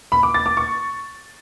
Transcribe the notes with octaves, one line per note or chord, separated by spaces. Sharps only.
B5
D6
A6
D6
C#6